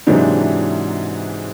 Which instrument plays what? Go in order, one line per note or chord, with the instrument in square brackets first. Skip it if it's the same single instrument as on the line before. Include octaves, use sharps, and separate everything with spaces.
[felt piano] G#2 C3 E3 F#3 D4 D#4